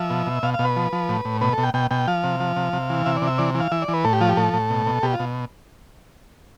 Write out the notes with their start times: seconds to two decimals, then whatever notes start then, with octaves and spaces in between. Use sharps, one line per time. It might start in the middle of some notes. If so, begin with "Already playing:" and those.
Already playing: F3 E5
0.10 B2
0.27 B2
0.43 B2 F5
0.54 F5
0.59 B2
0.65 B4
0.76 F3
0.93 F3
1.09 A2
1.25 A2
1.41 B2 B4
1.53 A4
1.58 B2
1.63 G5
1.74 B2 G5
1.91 B2 G5
2.08 F3 F5
2.24 C3
2.40 F3
2.56 C3
2.73 C3
2.90 E3
3.06 C3 E5
3.16 D5
3.22 C3
3.27 E5
3.38 E3 D5
3.55 E3
3.60 F5
3.72 E3 E5
3.82 D5
3.88 E3
3.94 B4
4.04 A2 A4
4.13 G4
4.21 F3 F4
4.29 G4
4.37 A2 A4
4.53 A2
4.70 B2
4.86 B2
5.03 B2 G4
5.13 F4
5.20 B2